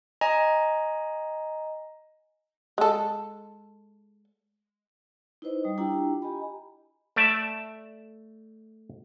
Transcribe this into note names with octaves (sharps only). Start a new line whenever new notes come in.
D#5 G#5 A#5
G#3 A4
D#4 E4 B4 C5 D#5
G3 D#6
D4 E4 F4 G4 G5 A#5
G4 D#5 G#5 A#5 B5
A3 D5 E5 A5